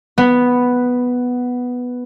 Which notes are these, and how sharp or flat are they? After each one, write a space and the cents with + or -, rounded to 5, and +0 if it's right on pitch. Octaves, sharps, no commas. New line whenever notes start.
B3 +0 B5 +0